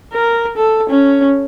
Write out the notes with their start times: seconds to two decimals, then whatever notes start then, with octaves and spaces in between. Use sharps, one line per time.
0.13 A#4
0.57 A4
0.90 C#4